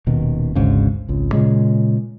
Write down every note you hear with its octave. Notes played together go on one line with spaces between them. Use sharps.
D#1 B2 D#3
G#1 D2 G#2 C#3
G#1 C#2
A#2 C#3 G#3